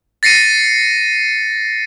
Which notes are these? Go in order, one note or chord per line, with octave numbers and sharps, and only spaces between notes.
A6 A#6 C7 C#7 D#7